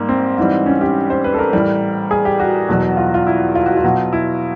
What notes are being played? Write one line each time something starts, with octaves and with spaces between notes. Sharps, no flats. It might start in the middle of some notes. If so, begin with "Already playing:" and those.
Already playing: G#2 G3 A#3
C4
G#2 E3 G3
C#4
G4
C5
B4
A4
A#4
A2 E3 G3
G#4
G4
F#4
E2 B2 F#3
F4
F4
E4
F4
F#4
F4
B2 F#3
E4